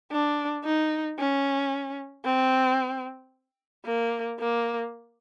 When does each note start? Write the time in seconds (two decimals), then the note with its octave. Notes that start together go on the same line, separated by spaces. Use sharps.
0.11 D4
0.65 D#4
1.19 C#4
2.25 C4
3.85 A#3
4.39 A#3